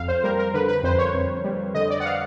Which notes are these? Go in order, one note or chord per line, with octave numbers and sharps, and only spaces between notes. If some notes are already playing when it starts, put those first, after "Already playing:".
Already playing: F2 F5
C5
G3 A#4
A#4
D3 B4
B4
F2 C5
C#5
F2
G3
D3 D#5
D5
F#5
F5